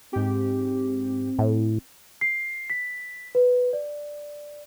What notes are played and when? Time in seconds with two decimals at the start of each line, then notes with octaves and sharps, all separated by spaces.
0.13 G#2 C4 G4
1.39 A2
2.21 C7
2.70 B6
3.35 B4
3.73 D5